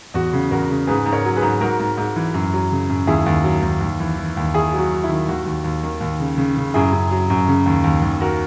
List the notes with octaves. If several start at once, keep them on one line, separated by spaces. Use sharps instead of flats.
E2 F#4
C#3
E2 F#4 A#4
C#3
G#2 G#4 B4
G#2
A#4 C#5
F#3
G#4 B4
G#2
G#2 F#4 A#4
G#2
G#2
E3
F#2
F#3
C#3
F#2
D#2 E4 G#4
D#2
F#3
D#2
D#2
E3
E3
D#2
D#3 E4 G#4
F#3
F#4
F#3
E4
D#3
D#2 F#4
D#2
D#2
D#3
D#2
C#3
C#3
C#3
F#2 E4 G#4
F#2
F#3
F#2
C#3
D#2
D#2
D#2
F#4 A#4